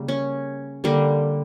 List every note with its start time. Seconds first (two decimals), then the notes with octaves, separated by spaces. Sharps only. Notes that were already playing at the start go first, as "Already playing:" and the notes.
Already playing: C#3 G3 A#3
0.08 C#4
0.84 D3 G3 A#3